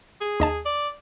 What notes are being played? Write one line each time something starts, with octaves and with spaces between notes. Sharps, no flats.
G#4
D#2 D#5 A5
D5